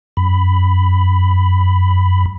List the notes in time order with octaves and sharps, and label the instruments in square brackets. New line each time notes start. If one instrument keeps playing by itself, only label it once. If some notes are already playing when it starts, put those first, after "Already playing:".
[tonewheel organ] F#2 B5